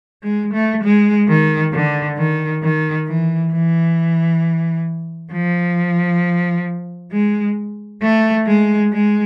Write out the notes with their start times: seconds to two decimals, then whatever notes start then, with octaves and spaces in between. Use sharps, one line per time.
0.23 G#3
0.53 A3
0.83 G#3
1.29 D#3
1.73 D3
2.18 D#3
2.62 D#3
3.07 E3
3.52 E3
5.33 F3
7.12 G#3
8.02 A3
8.46 G#3
8.92 G#3